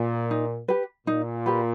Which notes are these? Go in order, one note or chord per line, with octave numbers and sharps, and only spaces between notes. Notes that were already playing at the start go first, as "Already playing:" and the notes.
Already playing: A#2
D#4
G4 B4
A#2 D#4
G4 B4